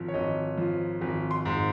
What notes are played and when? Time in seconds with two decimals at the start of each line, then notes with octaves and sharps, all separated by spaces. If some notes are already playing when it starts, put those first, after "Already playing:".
Already playing: G#1 F3
0.08 C#5
0.14 G#1 D#5
0.57 F3
1.01 G#1
1.31 C6
1.45 G#2